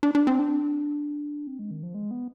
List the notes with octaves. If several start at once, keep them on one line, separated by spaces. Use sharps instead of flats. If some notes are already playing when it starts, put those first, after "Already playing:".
D4
D4
C4
D4
C4
G#3
D#3
F3
G#3
B3